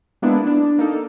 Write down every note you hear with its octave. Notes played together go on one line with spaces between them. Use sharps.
G#3 A#3 B3 D4 E4
D4
A#3 D#4 A4